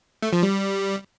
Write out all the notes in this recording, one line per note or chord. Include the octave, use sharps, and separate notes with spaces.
A3
F3
G3